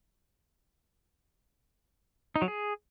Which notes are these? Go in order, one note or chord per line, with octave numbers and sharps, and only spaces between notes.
D#4
F#3
G#4